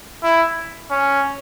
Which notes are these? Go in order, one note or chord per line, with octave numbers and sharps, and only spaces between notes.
E4
C#4